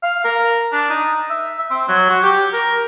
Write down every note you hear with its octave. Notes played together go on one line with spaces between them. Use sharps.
F5
A#4
D4
D#4
E5
E5
C4
F#3
F#4
G4
A#4